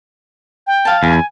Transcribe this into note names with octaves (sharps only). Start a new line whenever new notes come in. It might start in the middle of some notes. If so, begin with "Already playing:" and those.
G5
F5 A5
E2 G#5